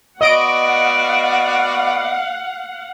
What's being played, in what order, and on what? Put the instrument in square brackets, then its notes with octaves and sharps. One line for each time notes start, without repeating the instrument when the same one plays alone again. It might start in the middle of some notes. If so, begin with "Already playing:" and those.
[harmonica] B3 F#4 D5 [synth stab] D#5 D7 [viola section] F5 F#5